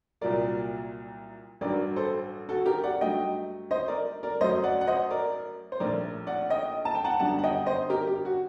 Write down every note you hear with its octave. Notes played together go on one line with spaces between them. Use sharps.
C2 A#2 F#3 A#3 A#4 D5
A1 G2 F#3 A#4 D5
A4 C5
F#4 A4
G4 A#4
D5 F#5
G2 F#3 A3 D#5 G5
C5 D#5
A#4 D5
A#4 D5
F#2 F#3 A3 C5 D#5
D5 F#5
F#5
C5 D#5
A#4 D5
C5
A#1 A2 A3 A#4 D5
D5 F#5
D#5 G5
A5
G5
F#5 A5
G1 F#2 D3 G3 F#5 A5
F#5
D#5 G5
C5 D#5
G4 A#4
G4
F#4